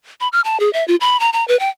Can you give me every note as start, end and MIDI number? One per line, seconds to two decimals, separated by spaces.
0.20 0.28 83
0.33 0.41 89
0.44 0.59 81
0.60 0.72 68
0.73 0.86 76
0.88 0.96 65
1.01 1.19 83
1.20 1.32 82
1.33 1.47 82
1.48 1.58 71
1.60 1.69 79